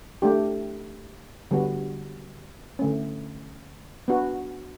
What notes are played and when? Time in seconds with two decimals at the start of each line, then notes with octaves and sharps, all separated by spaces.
0.22 A3 D4 G4
1.51 D3 G3 B3 F#4
2.79 D3 A3 C#4
4.08 B3 D4 F#4